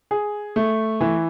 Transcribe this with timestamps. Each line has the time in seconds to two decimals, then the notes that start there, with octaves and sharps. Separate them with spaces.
0.11 G#4
0.56 A3
1.01 E3